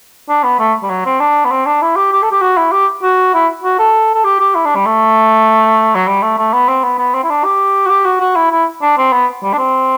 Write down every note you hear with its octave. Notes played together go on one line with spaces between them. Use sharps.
D4
B3
A3
G3
F#3
C4
D4
B3
C4
D4
E4
G4
G4
A4
G4
F#4
E4
G4
F#4
E4
F#4
A4
A4
G4
G4
E4
D4
G3
A3
F#3
G3
A3
A3
B3
C4
B3
B3
C4
E4
D4
G4
F#4
G4
F#4
F#4
E4
E4
D4
C4
B3
G3
D4
C4